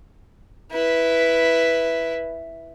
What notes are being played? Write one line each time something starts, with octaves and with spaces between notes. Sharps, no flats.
E4 B4